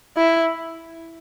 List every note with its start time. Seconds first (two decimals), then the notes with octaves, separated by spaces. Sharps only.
0.16 E4